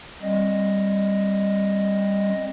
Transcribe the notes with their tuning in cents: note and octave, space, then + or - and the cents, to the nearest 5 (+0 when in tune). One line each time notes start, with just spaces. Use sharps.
G3 +10 C4 +20 D#5 +0